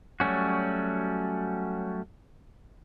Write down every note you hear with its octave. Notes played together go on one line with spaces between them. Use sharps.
F#3 G3 A3 C#4 F#4